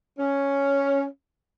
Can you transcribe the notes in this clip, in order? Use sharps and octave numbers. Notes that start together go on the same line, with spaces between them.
C#4